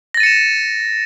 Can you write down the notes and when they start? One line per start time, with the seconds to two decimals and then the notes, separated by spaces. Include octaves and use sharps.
0.14 A#6
0.17 A6
0.20 D#7
0.23 C#7
0.26 E7